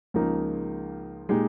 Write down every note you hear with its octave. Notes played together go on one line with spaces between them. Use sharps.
C#2 C#3 F3 A#3 D#4
A#2 G#3 D#4 G4